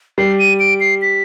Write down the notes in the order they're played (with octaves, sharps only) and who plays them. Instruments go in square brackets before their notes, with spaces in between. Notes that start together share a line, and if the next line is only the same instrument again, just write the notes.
[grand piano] G3 [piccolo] C7
[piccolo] D#7
D7
C7
B6